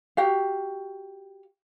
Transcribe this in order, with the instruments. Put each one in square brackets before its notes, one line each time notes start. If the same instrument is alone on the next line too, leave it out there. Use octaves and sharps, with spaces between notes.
[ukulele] F#4 G4 F5